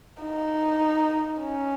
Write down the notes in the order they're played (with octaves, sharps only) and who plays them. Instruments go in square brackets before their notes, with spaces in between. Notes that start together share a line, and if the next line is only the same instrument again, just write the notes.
[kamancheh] D#4
C#4